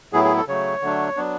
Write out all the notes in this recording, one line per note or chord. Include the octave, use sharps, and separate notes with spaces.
A2 F#3 B3 E4 G#4
G#4
A4
C#3 F#3 A3 C#5
D3 F#3 A3 D4
F#3 B3 D4